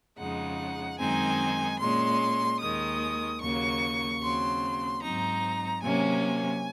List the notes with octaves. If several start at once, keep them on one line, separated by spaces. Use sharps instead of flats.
F2 C#3 G#3 D#4 F#5
F#2 D#3 G#3 C4 D#4 G#5
A#2 G#3 C#4 C6
D#2 D#3 G#3 D#6
D#2 C#3 F#3 A#3 C#6
D#2 C#3 F#3 C4 C6
G#2 F#3 C4 D#4 A#5
C3 F#3 A#3 C#4 G#5